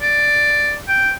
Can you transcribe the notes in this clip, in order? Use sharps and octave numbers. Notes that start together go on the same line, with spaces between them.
D5
G5